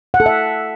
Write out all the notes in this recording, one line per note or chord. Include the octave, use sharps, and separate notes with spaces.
F#5
A4
E5